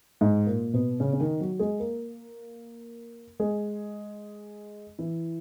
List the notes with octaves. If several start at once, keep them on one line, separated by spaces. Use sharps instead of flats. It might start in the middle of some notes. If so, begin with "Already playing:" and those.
G#2 G#3
A#2 A#3
B2 B3
C#3 C#4
C#4
D#3 D#4
F#3 F#4
G#3 G#4
A#3 A#4
G#3 G#4
E3 E4